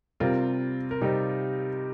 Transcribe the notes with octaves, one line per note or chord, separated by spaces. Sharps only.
C3 G3 C4 F4 A#4
A#4
C3 G3 C4 D#4 G4